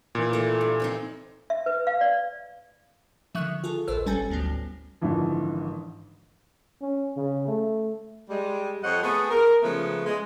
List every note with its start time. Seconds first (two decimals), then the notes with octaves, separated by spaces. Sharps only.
0.15 A#2 E3
0.33 A3 E4
0.61 G2
0.80 F3 C4 D#4
1.50 E5
1.66 B4
1.87 F5
2.01 D5
3.35 D3 D#3 F3 E5 C#6 F#6
3.64 F4 G#4 A4
3.88 A#1 D#2 A4 B4 C5 E6
4.06 G1 G3 C#4 A4 G#5 A6
4.30 D2 A2 F#3 B3
5.01 G#1 G#2 D3 E3 F3
6.82 C#4
7.17 C#3
7.48 A3
8.30 G3 G#3
8.83 F2 C5 C#5 D#5 F#5
9.03 A3 B3 G#4
9.30 A#4
9.63 C#3 F3 G#3 A3 B3
10.06 G#3